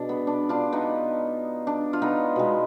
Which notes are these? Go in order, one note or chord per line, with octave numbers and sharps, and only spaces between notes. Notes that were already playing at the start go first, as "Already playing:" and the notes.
Already playing: B2 G#3 D4
B3
D4
D4 F4
B3 D#4
D4
F4
B3 D#4
B2 G#3